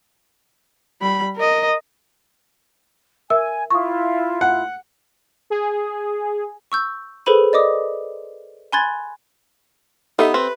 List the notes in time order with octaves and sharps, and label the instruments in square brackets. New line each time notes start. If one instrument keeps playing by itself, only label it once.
[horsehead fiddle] G3 B5
A#4 D#5
[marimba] A#4 E5 E6 [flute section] G#5
[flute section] E4 F4 [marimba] C#6 D#6
[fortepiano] F#5
[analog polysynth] G#4
[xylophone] C#6 E6 G6
G#4 A4 B4 C5 B5 D#7
D5 D#5 D6 D#6
G#5 B5 C6 F#6 G#6 A6
[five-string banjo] B3 [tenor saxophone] D#4 [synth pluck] G4 A4 E5
[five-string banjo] C4 [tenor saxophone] B4